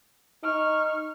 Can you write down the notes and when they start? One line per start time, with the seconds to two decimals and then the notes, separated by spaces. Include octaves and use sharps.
0.44 D#4 C#6 F6